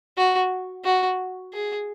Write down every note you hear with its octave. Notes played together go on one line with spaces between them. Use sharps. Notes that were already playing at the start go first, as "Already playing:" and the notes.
F#4
F#4
G#4